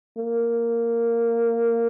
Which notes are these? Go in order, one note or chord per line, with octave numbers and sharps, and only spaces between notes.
A#3